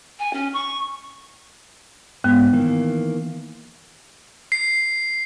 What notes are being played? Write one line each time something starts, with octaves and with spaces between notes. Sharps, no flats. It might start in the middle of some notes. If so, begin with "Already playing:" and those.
G#5
C#4
C#6
G#2 B3
D#3 E3 A#3
C7